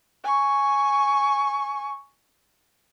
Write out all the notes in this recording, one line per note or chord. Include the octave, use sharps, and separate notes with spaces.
G#5 C#6